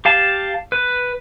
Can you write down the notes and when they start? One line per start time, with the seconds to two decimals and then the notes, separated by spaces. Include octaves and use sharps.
0.05 G4 F5 A5
0.72 B4